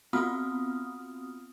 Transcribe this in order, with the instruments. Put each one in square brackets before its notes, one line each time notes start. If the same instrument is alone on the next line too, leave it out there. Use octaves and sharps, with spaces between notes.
[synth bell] B3 C4 F4 F#4 D#6 F6